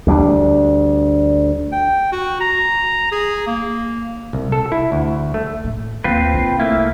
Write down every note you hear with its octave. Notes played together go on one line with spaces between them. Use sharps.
D2 G3 A#3 D4
G5
F#4
A#5
G#4
A#3
C2
A4
E4
D2
A3
A2
D#2 C4 F4 B4
C2
A3 A#3 E4